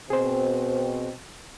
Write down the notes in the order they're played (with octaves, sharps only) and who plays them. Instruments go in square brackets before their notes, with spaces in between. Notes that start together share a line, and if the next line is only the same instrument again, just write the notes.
[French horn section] B2 C4 [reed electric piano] G#4 C5